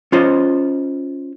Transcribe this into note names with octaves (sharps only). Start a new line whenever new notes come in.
C#4 F4 C5 D#5